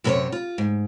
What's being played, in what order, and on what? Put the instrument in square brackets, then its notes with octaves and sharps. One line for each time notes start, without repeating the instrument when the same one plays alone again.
[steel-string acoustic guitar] F#2 C3 D#4 A#4 C5 C#5
F4
G#2